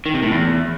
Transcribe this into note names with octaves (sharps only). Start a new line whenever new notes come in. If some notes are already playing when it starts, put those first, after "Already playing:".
D#3
C3
A2
E2